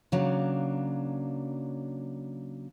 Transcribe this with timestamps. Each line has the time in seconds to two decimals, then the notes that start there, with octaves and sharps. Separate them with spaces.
0.12 C#3 F#3 A#3 D4